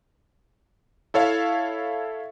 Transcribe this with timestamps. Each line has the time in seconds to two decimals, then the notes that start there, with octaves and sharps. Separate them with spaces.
1.14 E4 A4 C#5 E5 F5